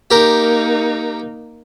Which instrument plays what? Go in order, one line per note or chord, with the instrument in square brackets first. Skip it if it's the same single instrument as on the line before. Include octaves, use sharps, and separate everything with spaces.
[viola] A#3 D#4 [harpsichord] G4 A#4